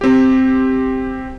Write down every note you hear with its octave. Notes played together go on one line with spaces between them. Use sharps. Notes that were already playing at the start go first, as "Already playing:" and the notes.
C4 G4